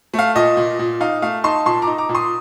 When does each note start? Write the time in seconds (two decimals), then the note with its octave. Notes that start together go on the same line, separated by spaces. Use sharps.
0.14 A3
0.19 F5
0.35 A#2 D#5
0.57 A#2
0.79 A#2
1.00 D#4 F5
1.22 A3 F5
1.44 D#4 A5 C6
1.66 A#2 A5 C6
1.82 A#5 D6
1.87 D#4
1.98 A#5 D6
2.09 A#2
2.15 C6 D#6